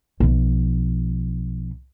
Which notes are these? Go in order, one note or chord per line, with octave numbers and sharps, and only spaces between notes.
B1 F3